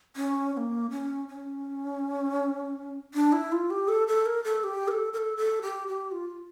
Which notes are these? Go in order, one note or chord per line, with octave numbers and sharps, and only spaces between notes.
C#4
C#4
A#3
C#4
C#4
D4
E4
F4
G4
A4
A4
A#4
A4
G4
A#4
A4
A#4
A4
A4
G4
G4
F4